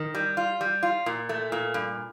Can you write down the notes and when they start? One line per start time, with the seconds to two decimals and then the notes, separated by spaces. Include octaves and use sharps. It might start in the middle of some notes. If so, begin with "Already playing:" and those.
Already playing: D#3
0.15 G3
0.37 F4
0.61 G3
0.83 F4
1.06 A#2
1.29 A3
1.52 A#2
1.74 G2